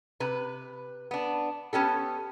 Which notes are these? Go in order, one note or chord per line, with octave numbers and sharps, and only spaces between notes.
C3 B4
B3 D4
B3 C#4 G4 A4